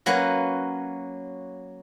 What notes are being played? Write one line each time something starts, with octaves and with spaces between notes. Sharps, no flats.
F#3 A#3 C#4 B4 F#5